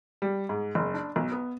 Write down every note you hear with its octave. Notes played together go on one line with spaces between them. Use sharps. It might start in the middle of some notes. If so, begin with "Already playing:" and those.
G3
G#2
F#1
D4
B1
B3